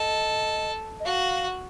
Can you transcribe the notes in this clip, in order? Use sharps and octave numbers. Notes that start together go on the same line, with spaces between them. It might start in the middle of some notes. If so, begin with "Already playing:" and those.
Already playing: A4 D#5
D#5
F#4 F5